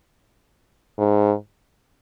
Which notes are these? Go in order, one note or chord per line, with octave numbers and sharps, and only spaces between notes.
G#2